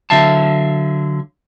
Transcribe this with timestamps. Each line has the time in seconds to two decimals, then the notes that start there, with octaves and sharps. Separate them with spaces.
0.10 D3 F#3 E5 F5 A5